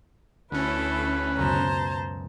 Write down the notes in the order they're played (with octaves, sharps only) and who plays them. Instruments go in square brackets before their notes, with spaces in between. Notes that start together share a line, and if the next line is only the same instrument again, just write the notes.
[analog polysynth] D2 C#4 [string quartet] E4 A4 [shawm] B4
[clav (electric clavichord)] C#2 F#2 B2 [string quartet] C5 A5 A#5